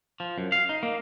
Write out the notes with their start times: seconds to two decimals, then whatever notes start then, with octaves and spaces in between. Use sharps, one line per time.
0.20 F3
0.38 F#2
0.52 F5
0.69 D#4
0.83 A#3